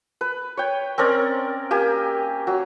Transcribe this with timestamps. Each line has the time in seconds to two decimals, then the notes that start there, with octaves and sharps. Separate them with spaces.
0.21 B4
0.57 C#5 G5
0.98 C4 C#4 A#4 D5
1.71 A#3 G4 G#5
2.47 F#3